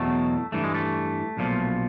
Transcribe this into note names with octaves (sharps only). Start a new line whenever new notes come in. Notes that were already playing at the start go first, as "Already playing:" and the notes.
Already playing: E2 B2 F#3 A3
G2 E3 A3
G#3
A3
B1 A#2 F3